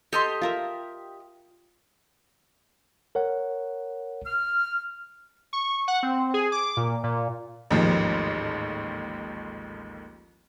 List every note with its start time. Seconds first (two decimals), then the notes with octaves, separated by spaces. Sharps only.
0.13 G4 A4 D#5 C6
0.42 F4 A#4 E5
3.15 A#4 C#5 F#5
4.26 F6
5.53 C#6
5.88 F#5
6.03 C4
6.34 G#4
6.52 D6
6.77 A#2
7.04 A#2
7.71 A1 D#2 G#2 D#3 F3